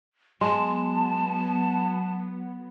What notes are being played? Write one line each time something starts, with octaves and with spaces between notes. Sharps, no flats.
F#3 G#3 B3 A5 C6